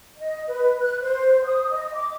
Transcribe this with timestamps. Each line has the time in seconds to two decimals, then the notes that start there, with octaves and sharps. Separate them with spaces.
0.17 D#5
0.47 B4
0.81 F#6
1.02 C5
1.44 D#6
1.70 D#5
1.94 D6